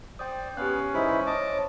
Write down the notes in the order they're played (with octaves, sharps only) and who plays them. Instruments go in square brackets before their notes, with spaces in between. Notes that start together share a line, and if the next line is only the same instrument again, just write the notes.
[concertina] C5 D5 [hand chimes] G5 D#6
[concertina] B3 F5 [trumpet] C#4 [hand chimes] G4 F#6
[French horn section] G#2 E3 [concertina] D#4 E4 B5 [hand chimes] C5
[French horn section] C#5 [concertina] D#5 A5 D6